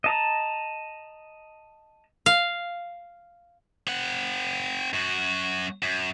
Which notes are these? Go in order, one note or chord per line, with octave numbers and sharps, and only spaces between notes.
D#5 A5 A#5
F5
C4 F#5
F#2 F#4
F#2